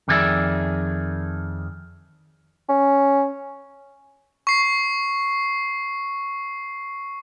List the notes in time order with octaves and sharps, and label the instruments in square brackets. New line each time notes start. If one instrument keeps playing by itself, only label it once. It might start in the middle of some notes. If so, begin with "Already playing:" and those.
[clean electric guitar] F2 D#3 D#4 G#4 D5 E5
[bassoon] C#4
[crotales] C#6 C7